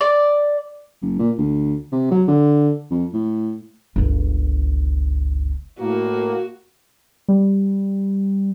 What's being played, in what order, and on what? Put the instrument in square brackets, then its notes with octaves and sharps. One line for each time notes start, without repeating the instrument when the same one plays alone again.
[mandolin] D5
[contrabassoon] F#1
A#2
D2
C3
F#3
D3
F2
A2
[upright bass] G1 C#2
[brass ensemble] A2 A#3 [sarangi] F#4
[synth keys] G3